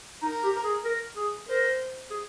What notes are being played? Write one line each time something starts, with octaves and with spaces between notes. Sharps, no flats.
D#4 A#4
G4
G#4
A#4
G#4
A#4 C5
G#4